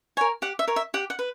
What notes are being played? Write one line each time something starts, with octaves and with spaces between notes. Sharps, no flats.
A#4 C#5 G#5
G4 F#5
E5
A#4 C#5
E5
G4 F#5
F#5
B4